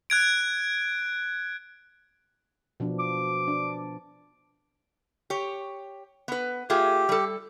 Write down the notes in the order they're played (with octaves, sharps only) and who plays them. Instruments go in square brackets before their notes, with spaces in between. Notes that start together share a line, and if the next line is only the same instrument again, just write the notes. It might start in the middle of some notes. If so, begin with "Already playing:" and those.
[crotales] F#6 G#6 D7
[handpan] B2 F3 D4
[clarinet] D6
[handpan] D4
[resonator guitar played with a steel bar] G4 C#5
B3 B4
[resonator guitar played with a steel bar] A3 F4 G#4 [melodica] G4
[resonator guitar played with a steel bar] G3 A4